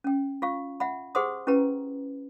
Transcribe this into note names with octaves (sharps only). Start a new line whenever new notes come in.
C#4 G5
F4 F5 C#6
E5 F#5 B5
G4 G#4 C5 F#5 C6 D#6
C#4 E4 G4 B4 A#5